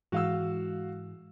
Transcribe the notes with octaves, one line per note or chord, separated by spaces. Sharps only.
G#2 E3 G#3 F#4 F5 E6